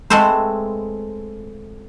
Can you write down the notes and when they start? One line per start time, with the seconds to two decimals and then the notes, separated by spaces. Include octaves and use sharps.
0.10 G#3 A3 C4 A4 B4 C5